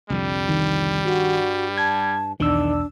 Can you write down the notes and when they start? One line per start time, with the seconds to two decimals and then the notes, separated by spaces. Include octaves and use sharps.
0.10 C2 F2 D3 G3
0.49 D#3
1.05 G2 F#4
1.77 A5 G#6
2.40 B1 E2 D#3 D4 E6